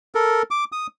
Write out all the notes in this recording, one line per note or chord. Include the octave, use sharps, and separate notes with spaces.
A4 A#4
D6
D#6